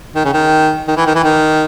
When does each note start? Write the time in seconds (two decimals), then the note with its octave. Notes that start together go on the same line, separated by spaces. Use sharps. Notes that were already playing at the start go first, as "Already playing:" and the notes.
0.15 D#3
0.25 C#3
0.33 D#3
0.88 D#3
0.97 E3
1.06 D#3
1.15 E3
1.24 D#3